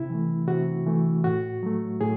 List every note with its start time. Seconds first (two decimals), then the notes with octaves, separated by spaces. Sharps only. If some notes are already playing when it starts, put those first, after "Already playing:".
Already playing: C3 E4
0.10 E3 A3
0.47 C3 F#4
0.86 E3 A3
1.24 A2 F#4
1.63 F#3 A3
2.01 A2 G#4